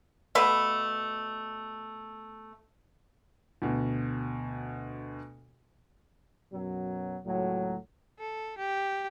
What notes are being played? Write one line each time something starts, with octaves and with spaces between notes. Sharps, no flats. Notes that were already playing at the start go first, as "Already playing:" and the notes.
B2 A3 B4 F5
D2 B2
F#2 B2 F#3
C#2 A2 F#3
A4
G4